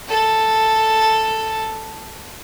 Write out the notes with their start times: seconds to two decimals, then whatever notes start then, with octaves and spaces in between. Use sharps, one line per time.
0.08 A4